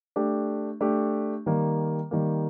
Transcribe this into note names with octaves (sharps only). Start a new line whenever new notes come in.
A3 D4 G4
A3 D4 G4
D#3 G3 A#3
D#3 G3 A#3